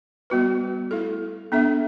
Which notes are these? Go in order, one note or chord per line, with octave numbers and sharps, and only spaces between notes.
G3 B3 F#4 B4
A3 E4 A4
B3 D4 A4 E5